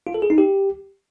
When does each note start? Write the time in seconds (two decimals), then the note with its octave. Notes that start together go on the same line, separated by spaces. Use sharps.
0.07 F4
0.14 A4
0.22 G#4
0.30 D#4
0.38 G4